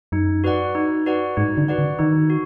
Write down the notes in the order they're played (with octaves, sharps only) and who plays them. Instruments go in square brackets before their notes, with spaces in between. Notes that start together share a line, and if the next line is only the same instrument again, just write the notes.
[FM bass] F#2 [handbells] D#4
[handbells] F#4 B4 D5 F#5
D#4
F#4 B4 D5 F#5
[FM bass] G#2 [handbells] D#4
[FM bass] D3
[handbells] F#4 B4 D5 F#5
[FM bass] D3
[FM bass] D#3 [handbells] D#4
[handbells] F#4